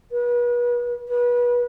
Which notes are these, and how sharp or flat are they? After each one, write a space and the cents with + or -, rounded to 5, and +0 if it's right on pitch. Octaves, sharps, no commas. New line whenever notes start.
B4 -35
B4 -30